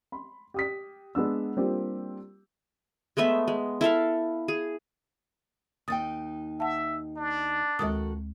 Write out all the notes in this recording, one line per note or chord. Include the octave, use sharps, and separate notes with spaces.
B5 C6
G4 D#6 B6
G#3 B3 D4 E6
G3 A#3 C4 D4 F4 G4
G#3 A3 B3 E5
G#3
E4 A4 E5 F5
G#4
D#2 D#4 G5 D#6 A6
E5 F#5 A5
D4
D2 D#3 G#3 F#4 A4 D#6